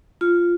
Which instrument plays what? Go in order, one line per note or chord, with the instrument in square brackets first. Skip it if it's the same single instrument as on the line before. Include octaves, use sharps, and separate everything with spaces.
[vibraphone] F4